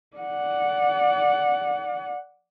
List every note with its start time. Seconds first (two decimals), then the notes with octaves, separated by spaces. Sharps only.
0.17 D5 F#5